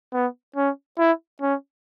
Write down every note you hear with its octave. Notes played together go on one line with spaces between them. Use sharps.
B3
C#4
E4
C#4